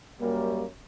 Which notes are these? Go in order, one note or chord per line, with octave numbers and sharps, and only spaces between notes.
F#2 G3 A#3